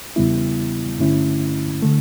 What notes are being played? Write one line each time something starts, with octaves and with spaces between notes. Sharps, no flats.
E2 C#3 G3 B3 E4
G2 D3 A3 C#4 E4
D3 A3